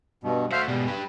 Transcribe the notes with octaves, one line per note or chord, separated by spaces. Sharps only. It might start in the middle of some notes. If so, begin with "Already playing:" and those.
G2 B2
A3 F#4 C5 E5 F5
G#2 B2 G3
G2 G4 B4